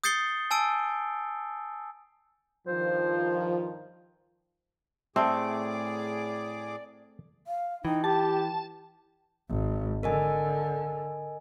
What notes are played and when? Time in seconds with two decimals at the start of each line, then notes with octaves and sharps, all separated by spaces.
0.04 D#6 G6 A6 C7 C#7 G7
0.51 G#5 A5 E6 D7
2.67 G2 D#3 F3 C5
5.16 A2 A3 C4 G#4 D5 D6
7.47 F5
7.85 E3 D#4 G5
8.04 G4 A5
9.50 G#1
10.03 D3 A#4 D#5 G#5